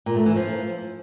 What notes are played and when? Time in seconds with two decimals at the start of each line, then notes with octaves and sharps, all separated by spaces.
0.06 A#2
0.16 A3
0.26 E3
0.36 F3